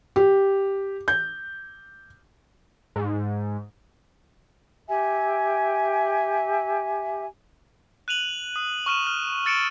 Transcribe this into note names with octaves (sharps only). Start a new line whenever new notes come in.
G4
G6
G#2
G4 E5 G#5
F#6 D#7 F7 F#7
D#6
C#6 F6 D#7 E7
F6
E6 A6 C#7 D7 E7